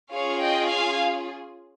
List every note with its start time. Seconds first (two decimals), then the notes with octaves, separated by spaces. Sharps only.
0.11 C#4 F4 G#4 C#5 F5
0.40 D#5 G5
0.68 F5 G#5